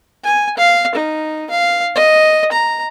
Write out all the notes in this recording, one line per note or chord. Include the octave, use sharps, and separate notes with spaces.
G#5
F5
D#4
F5
D#5
A#5